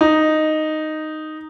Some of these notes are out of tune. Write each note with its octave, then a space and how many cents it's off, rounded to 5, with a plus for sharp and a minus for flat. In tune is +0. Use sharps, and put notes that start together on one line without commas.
D#4 -5